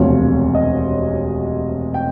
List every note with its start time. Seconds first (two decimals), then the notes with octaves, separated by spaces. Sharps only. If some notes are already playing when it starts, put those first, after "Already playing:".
Already playing: E1 D2 C3 F3 C#5
0.55 D#5
1.94 G5